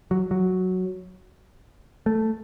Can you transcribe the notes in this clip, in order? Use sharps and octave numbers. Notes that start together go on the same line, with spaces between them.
F#3
F#3
A3